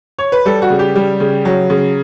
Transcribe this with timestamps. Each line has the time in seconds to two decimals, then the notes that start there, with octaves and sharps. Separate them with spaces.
0.19 C#5
0.32 B4
0.45 G3 A4
0.62 F#4
0.70 C#3
0.79 G4
0.95 G3
1.20 C#3
1.45 F#3
1.70 C#3